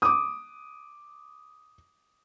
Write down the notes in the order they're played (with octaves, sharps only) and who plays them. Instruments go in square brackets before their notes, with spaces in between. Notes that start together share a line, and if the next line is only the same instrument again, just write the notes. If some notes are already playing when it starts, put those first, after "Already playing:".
[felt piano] D6 D#6